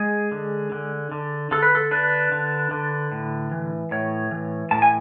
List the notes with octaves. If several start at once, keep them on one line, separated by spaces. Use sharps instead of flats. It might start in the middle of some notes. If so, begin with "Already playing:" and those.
Already playing: G#3 G#4
D3
D3
D3
D3 A4
B4
A4
D4 B4
D3
D3
A2
E3
A2 C#5
E3
A2 A5
G#5